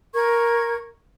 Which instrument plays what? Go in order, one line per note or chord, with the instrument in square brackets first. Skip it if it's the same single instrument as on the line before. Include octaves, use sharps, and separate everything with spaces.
[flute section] A#4 C#6 G#6